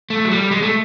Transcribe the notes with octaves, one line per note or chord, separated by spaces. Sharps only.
A3
F#3
G3
G#3
A3